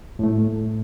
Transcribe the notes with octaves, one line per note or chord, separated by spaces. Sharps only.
A2 A3